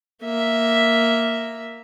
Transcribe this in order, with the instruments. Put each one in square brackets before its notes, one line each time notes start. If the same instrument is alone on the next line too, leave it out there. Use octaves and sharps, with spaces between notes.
[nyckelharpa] A#3 E5